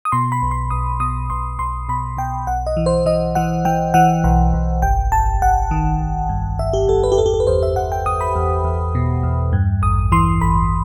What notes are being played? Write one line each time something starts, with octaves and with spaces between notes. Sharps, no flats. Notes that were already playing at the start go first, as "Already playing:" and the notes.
D#6
B2 C6
B5
B1
C6
B1 D#6
B2 D#6
B1 C6
B1 C6
B2 B5
B2 G5
B1 F#5
D#5
E3
C5
E3 D#5
E3 F#5
E3 G5
E3 F#5
B1 F#5
B1
G1 G5
G1 A5
G1 F#5
D#3
G1
G2
G1 E5
G4
G2 A4
B4
G4
E2 A4
G4
A4
B4
E2 C5
E5
E2 F#5
G5
E2 D#6
B5
E2
E2
B2
E2
G2
A1 D#6
E3 C6
A1 B5